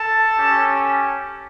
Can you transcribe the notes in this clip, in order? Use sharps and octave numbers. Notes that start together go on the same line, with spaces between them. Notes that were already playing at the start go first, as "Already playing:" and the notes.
Already playing: A4 A5
C#4 G4